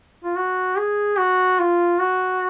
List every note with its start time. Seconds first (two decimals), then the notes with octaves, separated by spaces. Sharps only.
0.24 F4
0.36 F#4
0.78 G#4
1.18 F#4
1.60 F4
2.00 F#4